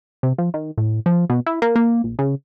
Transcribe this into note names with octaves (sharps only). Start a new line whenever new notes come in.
C3
F3
D#3
A2
F3
B2
E4
A#3
A#3
A#1
C#3